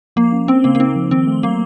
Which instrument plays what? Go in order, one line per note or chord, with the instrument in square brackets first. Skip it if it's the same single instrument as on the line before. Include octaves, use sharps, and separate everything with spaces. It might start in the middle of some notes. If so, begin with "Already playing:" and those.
[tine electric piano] F3 [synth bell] A#3
[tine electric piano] C#4
[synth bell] C4 [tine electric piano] C#4
[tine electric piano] C#3 [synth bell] A#3
[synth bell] A#3
[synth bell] C4 [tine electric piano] D#4
[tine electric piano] F3
[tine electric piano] D#3 [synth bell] C4
[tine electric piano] A3
[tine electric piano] F#3 [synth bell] A#3